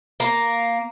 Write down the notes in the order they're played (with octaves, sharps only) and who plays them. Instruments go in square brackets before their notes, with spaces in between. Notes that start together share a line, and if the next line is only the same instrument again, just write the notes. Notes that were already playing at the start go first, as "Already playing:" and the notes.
[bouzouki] A#3